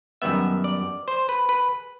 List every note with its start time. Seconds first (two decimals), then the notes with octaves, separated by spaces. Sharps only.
0.22 F#2 D#3 G3 B3 E5
0.64 D5
1.08 C5
1.29 B4
1.49 B4